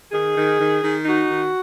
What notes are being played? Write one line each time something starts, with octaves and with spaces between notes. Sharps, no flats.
D#3 G#4
D#3
D#3
D#3
D#4 F#4
D#3